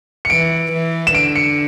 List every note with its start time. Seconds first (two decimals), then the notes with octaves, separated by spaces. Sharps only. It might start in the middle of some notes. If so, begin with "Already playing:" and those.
0.25 C#7
0.30 E3 D7
0.72 E3
1.07 E7
1.14 D3 D7
1.35 C#7